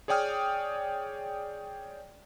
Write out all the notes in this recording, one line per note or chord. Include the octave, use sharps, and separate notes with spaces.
G#4 C#5 D5 G5 D#6 F6